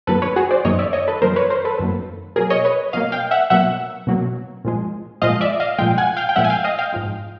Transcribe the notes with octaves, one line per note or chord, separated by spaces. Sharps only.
F#2 D#3 F#3 A#3 A4 B4
B4 C#5
F#4 G#4
C5 D5
F#2 D#3 F#3 A#3 C#5 D#5
D5 E5
C#5 D#5
A4 B4
F#2 D#3 F#3 A#3 A#4 C5
B4 C#5
A#4 C5
A4 B4
F#2 D#3 F#3 A#3
B2 F#3 A#3 G#4 A#4
C#5 D#5
B4 C#5
B2 F#3 A#3 D#5 F5
F5 G5
E5 F#5
B2 F#3 A#3 E5 F#5
B2 F#3 A#3
A#2 F3 G#3
A#2 F3 G#3 D#5 F5
D5 E5
D#5 F5
A#2 F3 G#3 F5 G5
F#5 G#5
F5 G5
G5
A#2 F3 G#3 E5 F#5
G#5
F5 G5
D#5 F5
F5 G5
G#2 F3 G#3